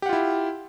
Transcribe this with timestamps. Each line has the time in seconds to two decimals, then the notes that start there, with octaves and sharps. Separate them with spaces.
0.02 G4
0.06 F#5
0.09 F4
0.13 E4